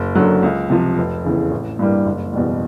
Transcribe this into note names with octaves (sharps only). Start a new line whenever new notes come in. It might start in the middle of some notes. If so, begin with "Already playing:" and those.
Already playing: F#1
F#2 D3 F#3
C#2
C3 F3
F1
E2 C#3 E3
A1
G2 E3 G3 A#3
F#1
E2 B2 G3